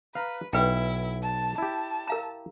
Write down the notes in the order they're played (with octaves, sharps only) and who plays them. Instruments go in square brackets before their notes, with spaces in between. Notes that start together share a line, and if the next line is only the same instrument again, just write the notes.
[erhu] B4 [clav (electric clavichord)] F5 A#5
[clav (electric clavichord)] B1 [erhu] E4 [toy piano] B4 G5
[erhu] A5
[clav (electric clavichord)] E4 G4 [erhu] A5
[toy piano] A#4 F5 A#5